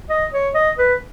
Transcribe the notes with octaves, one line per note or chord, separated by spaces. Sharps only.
D#5
C#5
D#5
B4